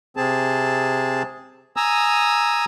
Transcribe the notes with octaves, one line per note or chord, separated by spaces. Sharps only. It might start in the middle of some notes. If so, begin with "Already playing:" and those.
C3 C4 G#4 A5
G#5 A#5 D#6 E6